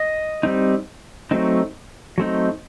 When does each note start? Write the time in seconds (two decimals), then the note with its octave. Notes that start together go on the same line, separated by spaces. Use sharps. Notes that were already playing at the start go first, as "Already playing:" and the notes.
Already playing: D#5
0.43 G3 C4 D#4
1.31 F#3 A3 C4 D#4
2.18 F#3 A3 C4 D#4